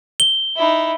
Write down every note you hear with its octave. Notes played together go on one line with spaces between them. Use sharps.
G7
D#4 E4